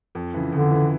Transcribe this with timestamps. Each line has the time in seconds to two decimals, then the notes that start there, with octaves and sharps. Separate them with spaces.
0.15 F2
0.34 C#3 E3
0.52 F2 D3
0.71 C#3 E3